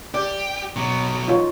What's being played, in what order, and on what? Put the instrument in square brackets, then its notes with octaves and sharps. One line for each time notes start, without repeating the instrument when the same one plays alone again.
[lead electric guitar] G4 [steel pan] D5
[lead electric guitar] B2 F#3
[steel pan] D#4 F4 C#5